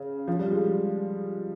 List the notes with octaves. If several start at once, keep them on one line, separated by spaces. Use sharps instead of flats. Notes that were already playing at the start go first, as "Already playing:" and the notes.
Already playing: C#3
F3
G3
G#3